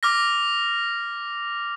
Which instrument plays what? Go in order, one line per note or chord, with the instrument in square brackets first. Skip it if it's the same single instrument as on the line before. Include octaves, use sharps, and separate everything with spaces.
[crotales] D6 F6 A#6